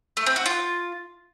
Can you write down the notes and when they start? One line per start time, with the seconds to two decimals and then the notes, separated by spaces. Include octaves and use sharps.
0.17 A3
0.26 C4
0.36 F#4
0.46 F4